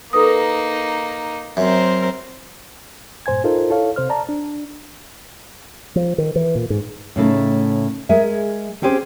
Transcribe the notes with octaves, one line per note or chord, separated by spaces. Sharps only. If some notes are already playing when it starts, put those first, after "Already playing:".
A#3 D#4 A4 B4 D#6
F#2 C4 A#4 C5
G2 A#2 C5 G#5 G#6
D#4 F4 A4 A#4 C5
E4 A4 C#5 F5
C3 C5 F6
D5 A5 A#5
D4
F3
D#3
E3
A#2
G#2
A2 C#3 A3 D#4
G#3 G#4 A#4 E5
C4 C#4 G4 G#4 C5